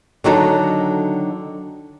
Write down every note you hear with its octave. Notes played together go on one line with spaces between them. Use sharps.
D3 D#3 F#3 D#4 F#4 A4